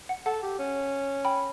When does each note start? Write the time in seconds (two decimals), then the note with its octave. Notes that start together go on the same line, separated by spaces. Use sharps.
0.09 F#5
0.26 A4 F#5 A5
0.43 G4
0.59 C#4
1.25 G5 B5